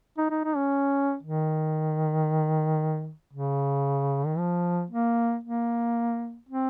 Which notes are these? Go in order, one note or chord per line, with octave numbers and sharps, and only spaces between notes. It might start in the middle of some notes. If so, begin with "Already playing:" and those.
D#4
D#4
D#4
C#4
D#3
C#3
D#3
F3
A#3
A#3
C4